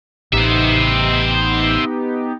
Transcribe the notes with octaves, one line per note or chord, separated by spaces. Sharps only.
A1 B3 D#4 G4 C5 E5